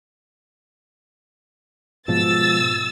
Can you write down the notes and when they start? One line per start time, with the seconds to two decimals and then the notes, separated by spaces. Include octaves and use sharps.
2.08 G#2 B2 F3 E6 A6